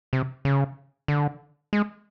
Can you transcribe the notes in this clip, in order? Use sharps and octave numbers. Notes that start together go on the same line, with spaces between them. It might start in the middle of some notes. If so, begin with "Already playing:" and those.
C3
C#3
D3
G#3